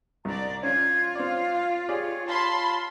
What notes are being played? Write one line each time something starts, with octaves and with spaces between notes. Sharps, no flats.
C2 D4 D5 A#5
C#4 F4 G#6
C4 D5 F5
G4 G#4 C#5 D5
F4 A5 B5 C6